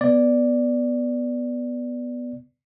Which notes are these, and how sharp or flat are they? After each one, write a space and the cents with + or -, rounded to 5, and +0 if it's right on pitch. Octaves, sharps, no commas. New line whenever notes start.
B3 +0 D5 +0